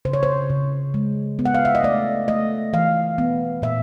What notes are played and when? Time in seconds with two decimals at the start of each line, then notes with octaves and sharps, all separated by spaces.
0.05 C#3 C5
0.13 C#5
0.23 C5
0.50 C#3
0.94 G#3
1.39 B3
1.46 F#5
1.54 F5
1.65 E5
1.75 D#5
1.83 A3 D5
2.28 A3 D#5
2.73 E3 F5
3.18 B3
3.62 A#2 E5